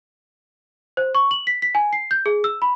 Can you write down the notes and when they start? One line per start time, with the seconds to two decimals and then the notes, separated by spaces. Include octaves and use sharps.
0.97 C5
1.15 C#6
1.31 F#7
1.47 B6
1.62 B6
1.75 G#5
1.93 C7
2.11 G6
2.26 G#4
2.44 E6
2.62 B5